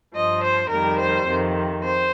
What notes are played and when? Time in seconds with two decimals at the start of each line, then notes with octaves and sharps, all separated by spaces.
0.14 G2 F3 D#5
0.43 C5
0.70 F2 D#3 G3 A#4
0.99 C5
1.27 F2 C3 D#3
1.83 C5